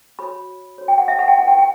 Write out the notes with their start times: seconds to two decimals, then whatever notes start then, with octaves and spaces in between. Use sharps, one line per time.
0.19 F#4 C#5 B5
0.78 F#4 C#5
0.88 G5
0.98 F#5
1.08 E5
1.19 F#5
1.28 G5
1.38 E4 F#5
1.43 B4
1.48 G5
1.58 G5